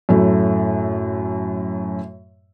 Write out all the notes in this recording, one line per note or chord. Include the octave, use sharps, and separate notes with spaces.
F#2 A2 F#3 A3